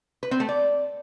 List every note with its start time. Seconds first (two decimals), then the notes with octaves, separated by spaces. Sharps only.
0.23 B4
0.31 C4
0.40 A3
0.49 D5